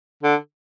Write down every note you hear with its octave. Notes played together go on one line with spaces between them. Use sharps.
D3